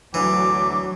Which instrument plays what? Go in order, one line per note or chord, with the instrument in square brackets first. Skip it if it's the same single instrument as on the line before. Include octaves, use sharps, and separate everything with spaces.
[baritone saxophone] D2 [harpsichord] E3 [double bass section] F#3 [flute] D6